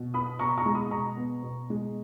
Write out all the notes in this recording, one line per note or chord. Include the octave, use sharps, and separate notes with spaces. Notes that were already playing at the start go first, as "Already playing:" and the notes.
Already playing: B2
B3 B5 D#6
B2 A#5 C#6
A#5 C#6
G#3
B5 D#6
B2 A#5 C#6
B3
B2
G#3